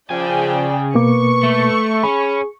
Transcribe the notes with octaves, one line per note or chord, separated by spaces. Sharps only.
C#3 F3 G#4 D5 G5 G#5
B2 A#3 B4 C#6 D6
A3
C#4 G#4 B5